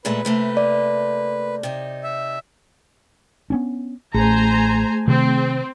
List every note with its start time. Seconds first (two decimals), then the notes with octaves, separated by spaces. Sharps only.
0.05 A#2 G#3 A3 B4
0.25 C3 A3 A#3
0.57 D5
1.63 C3 D#4
2.04 E5
3.50 B3 C#4 D4
4.14 A1 A3 G#4 C5 G#5 A#5
5.08 C3 D#3 C4